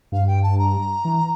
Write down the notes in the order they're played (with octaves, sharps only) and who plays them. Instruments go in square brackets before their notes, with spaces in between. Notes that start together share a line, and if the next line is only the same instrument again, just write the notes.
[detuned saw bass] G2 [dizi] F5
[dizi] G5
A5
A#5
[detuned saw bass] E3